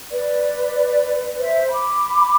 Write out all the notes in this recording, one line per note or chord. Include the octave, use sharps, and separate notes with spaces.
B4 D5
C5 E5
B5 D6